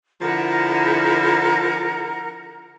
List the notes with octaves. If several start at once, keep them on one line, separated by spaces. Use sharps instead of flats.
D3 F3 E4 A#4 F#5 A#5